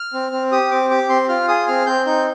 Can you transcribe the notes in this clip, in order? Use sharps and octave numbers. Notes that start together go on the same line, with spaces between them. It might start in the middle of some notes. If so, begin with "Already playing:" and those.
Already playing: F6
C4
C4
G4 D#6
C4 D6
G4 D6
C4 C6
F4 F6
G#4 D#6
C4 F6
C4 G6
D#4 G6